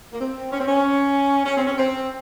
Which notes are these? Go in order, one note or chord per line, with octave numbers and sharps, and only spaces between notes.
A#3
C4
C#4
C4
C#4
C#4
C4
C#4
C4